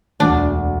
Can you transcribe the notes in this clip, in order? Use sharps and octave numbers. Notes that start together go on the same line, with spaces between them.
E1 D2 D3 D4